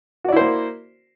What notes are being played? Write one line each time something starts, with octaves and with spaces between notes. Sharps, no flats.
A#3 E4 F#4 C5 D5